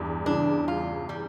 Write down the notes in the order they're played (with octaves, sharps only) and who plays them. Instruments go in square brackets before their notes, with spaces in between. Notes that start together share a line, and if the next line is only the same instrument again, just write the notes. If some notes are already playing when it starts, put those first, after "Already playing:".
Already playing: [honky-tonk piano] E2 G2
[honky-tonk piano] C#3 E3 [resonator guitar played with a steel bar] D4
[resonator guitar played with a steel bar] F4
G3